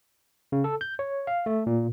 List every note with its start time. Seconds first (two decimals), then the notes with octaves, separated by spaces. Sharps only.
0.52 C#3
0.64 A4
0.81 G6
0.99 C#5
1.27 F5
1.46 A3
1.67 A#2